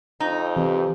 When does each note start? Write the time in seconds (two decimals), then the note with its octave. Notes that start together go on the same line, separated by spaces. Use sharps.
0.20 F2 D#4
0.56 C3 E3